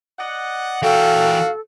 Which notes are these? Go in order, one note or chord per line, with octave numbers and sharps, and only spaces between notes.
D5 D#5 F#5
A#2 E3 F#4 A4 F5 G5